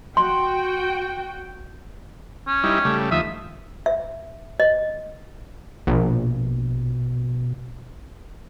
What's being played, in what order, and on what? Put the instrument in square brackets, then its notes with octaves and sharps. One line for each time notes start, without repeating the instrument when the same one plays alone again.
[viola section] F#4 G5 [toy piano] C6
[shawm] C#4
[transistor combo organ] G3 D#4 E4
C#3 G3 A3
[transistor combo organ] D#2 F3 D#6 [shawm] E5
[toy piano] E5
D#5
[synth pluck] A#1 [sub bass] B2